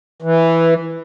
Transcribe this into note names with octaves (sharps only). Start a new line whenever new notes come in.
E3